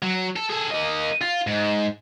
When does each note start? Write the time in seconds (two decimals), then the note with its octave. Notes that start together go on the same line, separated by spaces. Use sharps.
0.02 F#3
0.36 A4
0.50 G#4 A4
0.71 A#3 D#5
1.21 F4
1.47 G#2